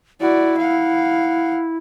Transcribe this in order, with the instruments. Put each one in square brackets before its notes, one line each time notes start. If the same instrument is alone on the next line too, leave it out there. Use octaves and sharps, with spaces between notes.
[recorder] E4 [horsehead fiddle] F#4 D5
[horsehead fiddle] F5 F#5